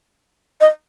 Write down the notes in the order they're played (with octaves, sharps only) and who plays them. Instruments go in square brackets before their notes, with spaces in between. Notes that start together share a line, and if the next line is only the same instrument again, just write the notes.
[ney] D#5